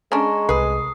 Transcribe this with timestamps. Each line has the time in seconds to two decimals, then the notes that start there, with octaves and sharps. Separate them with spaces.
0.12 G#3 C#4 D4 A#5 C#6
0.49 C2 B4 D#6 C7